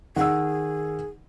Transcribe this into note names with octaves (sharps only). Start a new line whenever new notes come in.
D#3 G#4 F#5 E6